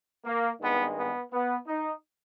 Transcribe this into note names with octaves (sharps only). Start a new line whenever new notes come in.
A#3
G#1 G2 D#3 G#3 B3
B3
B3
D#4